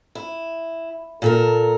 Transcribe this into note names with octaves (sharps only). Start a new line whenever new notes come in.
E4
A#2 A4 A#4